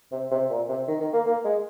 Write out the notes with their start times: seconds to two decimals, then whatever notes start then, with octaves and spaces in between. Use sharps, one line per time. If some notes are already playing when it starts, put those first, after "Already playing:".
0.12 C3
0.31 C3
0.50 A#2
0.69 C3
0.88 D#3
1.00 D#3
1.13 A#3
1.26 A#3
1.44 G#3